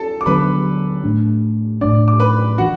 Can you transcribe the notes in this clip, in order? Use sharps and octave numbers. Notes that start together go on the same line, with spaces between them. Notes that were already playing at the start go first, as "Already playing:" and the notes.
Already playing: A4 A5
D6
D3 F#3 B3 D4 B4 B5
A2 A3 D4
A2 A3 D4 D5 D6
D6
B4 B5
E3 D4 F#4 F#5